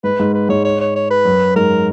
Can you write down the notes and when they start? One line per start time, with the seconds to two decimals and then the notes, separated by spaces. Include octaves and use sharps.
0.04 G#2 B4
0.20 G#2
0.34 B4
0.49 G#2 C#5
0.65 C#5
0.80 C#5
0.95 C#5
1.10 B4
1.25 F#2
1.56 G#2 A#4